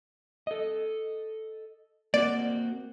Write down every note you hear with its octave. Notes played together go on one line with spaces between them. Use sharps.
A4 D#5
A#3 C4 F#4 D5